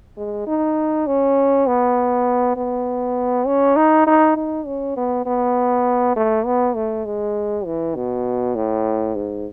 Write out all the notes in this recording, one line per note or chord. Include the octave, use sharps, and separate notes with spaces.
G#3
D#4
C#4
B3
B3
C#4
D#4
D#4
D#4
C#4
B3
B3
A3
B3
A3
G#3
E3
B2
A2
G#2